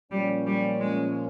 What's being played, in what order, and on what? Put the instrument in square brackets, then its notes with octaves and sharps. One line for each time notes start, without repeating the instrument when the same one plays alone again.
[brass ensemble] A#2 F3 A#3 C#4 [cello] G3
[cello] G3
G#3